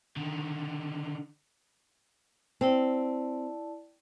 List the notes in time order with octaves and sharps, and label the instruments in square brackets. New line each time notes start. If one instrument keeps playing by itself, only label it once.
[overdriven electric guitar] D3 D#3
[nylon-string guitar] C4 [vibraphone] E4 D5 A5